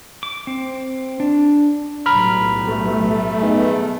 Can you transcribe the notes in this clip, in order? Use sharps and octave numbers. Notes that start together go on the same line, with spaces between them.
D6
C4
D4
B1 A2 G3 A#5 B5 F6
A3
B3 D#4 G#4